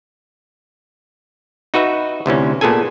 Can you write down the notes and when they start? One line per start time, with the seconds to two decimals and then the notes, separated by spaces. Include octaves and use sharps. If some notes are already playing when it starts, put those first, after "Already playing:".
1.74 D#4 F#4 B4 E5
2.26 D2 C3 E3 C#4
2.61 A#2 B3 G#4 A4 G#5